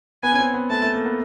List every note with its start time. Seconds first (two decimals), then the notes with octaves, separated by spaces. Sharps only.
0.23 B3 G#5
0.32 C#4
0.39 C4
0.54 B3
0.70 A3 A5
0.82 A3
0.94 A#3
1.05 B3